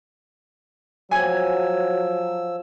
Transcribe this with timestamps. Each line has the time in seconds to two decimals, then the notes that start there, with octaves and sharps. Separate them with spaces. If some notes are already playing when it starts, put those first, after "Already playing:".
1.11 F3 F#3 G#5 E6